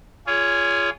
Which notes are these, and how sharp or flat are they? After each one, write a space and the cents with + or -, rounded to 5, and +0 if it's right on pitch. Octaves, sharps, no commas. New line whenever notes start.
F4 -15 G#4 +0 C#5 +30